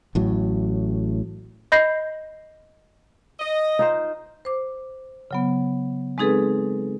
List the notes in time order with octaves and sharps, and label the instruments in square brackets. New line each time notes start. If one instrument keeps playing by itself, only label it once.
[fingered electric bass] A1 A2 F#3
[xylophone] D#5 B5 G6 A#6 C7
[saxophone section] D#5
[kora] D#4 F4 C5
[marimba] C5 D6
C#3 F#3 B3
G#3 C4 D#4 G#4 A4 B4